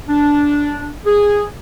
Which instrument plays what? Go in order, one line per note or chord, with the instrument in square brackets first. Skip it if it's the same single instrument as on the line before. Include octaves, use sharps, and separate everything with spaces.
[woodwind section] D4
G#4